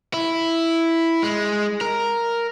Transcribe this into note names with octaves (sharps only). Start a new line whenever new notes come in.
E4
G#3
A#4